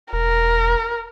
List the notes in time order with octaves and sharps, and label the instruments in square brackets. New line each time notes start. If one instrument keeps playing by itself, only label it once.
[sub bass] E1 [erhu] A#4